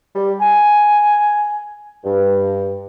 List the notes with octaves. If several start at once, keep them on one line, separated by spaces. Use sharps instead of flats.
G3
G#5
G2